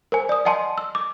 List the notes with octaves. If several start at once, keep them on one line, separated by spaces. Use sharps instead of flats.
A#4 C5 G#5
D5 D#6
D#5 F#5 G#5 A5 C6
E6
D6